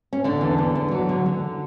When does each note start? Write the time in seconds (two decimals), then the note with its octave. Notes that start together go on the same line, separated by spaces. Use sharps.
0.13 C#4
0.24 D3 D4
0.41 E2
0.58 D3
0.75 E2
0.91 F#3
1.09 D3
1.26 D3